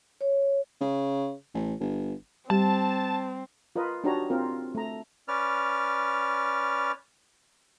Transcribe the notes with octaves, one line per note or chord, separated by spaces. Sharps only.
C#5
C#3
A1
G1
G3 C4 G4 A5
F4 A#4 B4 D#5
D4 D#4 F#4 G4 C#5 A#5
C4 F4 A#4
A3 A#5
C#4 B4 D5 F6